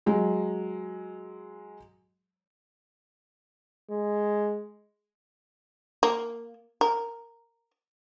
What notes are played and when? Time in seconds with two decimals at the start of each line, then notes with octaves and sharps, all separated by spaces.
0.06 F#3 G#3
3.90 G#3
6.03 A#3
6.81 A#4